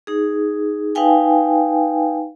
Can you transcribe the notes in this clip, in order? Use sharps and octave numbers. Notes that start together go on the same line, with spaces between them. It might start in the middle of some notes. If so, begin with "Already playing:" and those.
D#4 G#4
D#4 B4 F5 G5 G#5